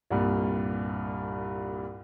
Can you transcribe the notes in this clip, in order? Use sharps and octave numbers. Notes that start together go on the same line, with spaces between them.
C2 G2 A#2